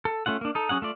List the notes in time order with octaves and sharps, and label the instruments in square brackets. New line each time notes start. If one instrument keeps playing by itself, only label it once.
[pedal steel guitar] A4
A3 C#4 F4 F#5
A#3 D4
D#4 A4
F#3 C#4 G#4 F#5
A3 F4 D5